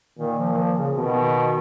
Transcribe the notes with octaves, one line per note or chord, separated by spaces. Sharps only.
A#2 D#3
F3
D#3
F3
C#3
B2 D#3